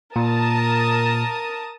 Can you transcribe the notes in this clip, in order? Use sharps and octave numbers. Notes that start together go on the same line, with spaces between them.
A#2 A#4 A5 D#6